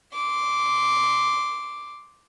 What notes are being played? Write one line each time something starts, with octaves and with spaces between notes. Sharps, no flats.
C6 D6